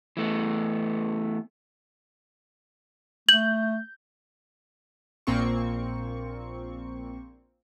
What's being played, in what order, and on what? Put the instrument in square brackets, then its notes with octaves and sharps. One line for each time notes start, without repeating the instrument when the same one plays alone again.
[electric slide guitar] E3 A3 B3
[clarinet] A3 [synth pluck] G6 [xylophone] F#7
[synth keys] A#1 A#2 A#3 C4 F4 C#6